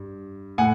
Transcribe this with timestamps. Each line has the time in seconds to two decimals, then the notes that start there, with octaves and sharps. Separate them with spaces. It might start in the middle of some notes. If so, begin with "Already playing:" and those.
Already playing: G2
0.58 A2 F#5 G#5